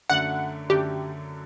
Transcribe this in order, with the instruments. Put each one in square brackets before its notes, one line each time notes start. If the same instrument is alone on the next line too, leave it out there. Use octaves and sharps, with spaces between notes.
[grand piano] F#2 D3 A3 D4 [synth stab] F#5
[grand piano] F#2 D3 A3 D4 [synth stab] G4